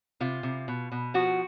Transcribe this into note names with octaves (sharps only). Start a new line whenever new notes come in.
C3 F4
C3
B2
B2
F3 F#4